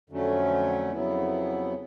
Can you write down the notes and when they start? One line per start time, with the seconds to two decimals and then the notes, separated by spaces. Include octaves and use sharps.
0.10 F2 D3 F#3 A3 C#4
0.92 F2 C#3 F#3 B3 E4